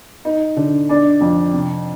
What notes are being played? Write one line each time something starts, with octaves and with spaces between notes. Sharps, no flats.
D#4
D3
D4
F2
C3